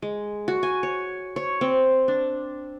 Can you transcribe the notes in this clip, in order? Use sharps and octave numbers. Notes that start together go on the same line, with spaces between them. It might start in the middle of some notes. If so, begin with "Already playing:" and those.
G#3
F#4
G#5
C#5
C#5
C4
D4